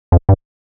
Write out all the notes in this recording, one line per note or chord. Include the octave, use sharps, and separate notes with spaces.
F2
G2